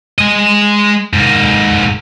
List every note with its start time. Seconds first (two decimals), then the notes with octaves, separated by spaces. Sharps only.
0.19 G#3 D#5
1.13 G#2 A#3